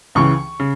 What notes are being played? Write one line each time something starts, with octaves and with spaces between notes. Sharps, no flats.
C#2 C#3 E3 C#6
C#3